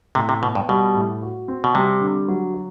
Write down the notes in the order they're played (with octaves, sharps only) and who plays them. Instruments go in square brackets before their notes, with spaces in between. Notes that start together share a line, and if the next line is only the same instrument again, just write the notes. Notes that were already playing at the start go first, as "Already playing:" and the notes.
[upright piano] A2 [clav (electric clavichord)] C3
[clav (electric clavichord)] C3
[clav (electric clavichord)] B2 [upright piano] B3
[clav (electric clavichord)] G2
[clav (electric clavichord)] B2 [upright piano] G3
[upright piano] A2
F#4
C4
[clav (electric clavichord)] B2
[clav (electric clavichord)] C3 [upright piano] G3
[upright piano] D3
F#3
F#4